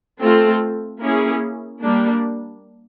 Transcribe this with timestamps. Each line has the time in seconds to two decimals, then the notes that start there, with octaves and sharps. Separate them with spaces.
0.20 A3 C4 F4 A4
1.00 A#3 C#4 E4 G#4
1.81 G3 A#3 D4